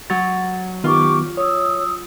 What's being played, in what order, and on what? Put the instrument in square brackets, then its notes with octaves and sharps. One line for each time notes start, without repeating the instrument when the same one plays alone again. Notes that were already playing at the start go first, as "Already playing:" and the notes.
[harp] F#3 [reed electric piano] A6
[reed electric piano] D#3 F#3 B3 [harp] F4 [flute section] G4 C#6 D6
[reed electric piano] C#5 [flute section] D#6 E6